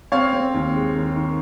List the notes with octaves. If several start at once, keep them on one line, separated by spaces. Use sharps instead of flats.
C4 C#5 F5
C4
D#2
G#3
D#3
D#3